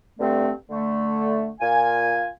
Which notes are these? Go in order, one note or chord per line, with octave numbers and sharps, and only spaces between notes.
G2 D3 A3 C4
D3 A3
A#2 F4 G#5